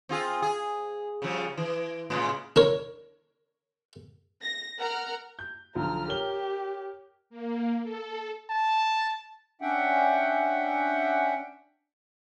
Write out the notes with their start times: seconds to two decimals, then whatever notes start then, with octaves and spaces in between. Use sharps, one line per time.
0.09 C4 F4 G#4
0.42 G#4
1.22 C#3 F3 G3
1.57 E3
2.10 A2 C#3 G#3
2.56 D4 A#4 C#5
4.42 A#6
4.78 A#4 F#5 A#5 F6
5.39 G6
5.75 B1 D3 F3 A#5 F6
6.08 G4 A#4 C#5 G7
7.30 A#3
7.83 A4
8.50 A5
9.61 C#4 D4 E5 F#5 G5